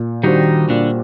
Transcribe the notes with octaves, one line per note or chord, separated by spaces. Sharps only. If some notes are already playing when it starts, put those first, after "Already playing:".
Already playing: A#2
D#3 G3 D4 D#4 F#4 C5
A#2 D3 D4